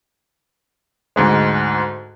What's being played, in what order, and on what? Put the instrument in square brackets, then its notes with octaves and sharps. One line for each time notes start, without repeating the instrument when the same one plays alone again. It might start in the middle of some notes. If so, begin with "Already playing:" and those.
[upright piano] D2 G#2 G#3